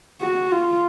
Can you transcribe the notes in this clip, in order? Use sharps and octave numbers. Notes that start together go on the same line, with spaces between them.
F#4
F4